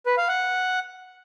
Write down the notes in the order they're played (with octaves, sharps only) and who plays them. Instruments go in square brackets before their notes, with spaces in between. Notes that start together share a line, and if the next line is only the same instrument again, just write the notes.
[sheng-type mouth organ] B4
F5
F#5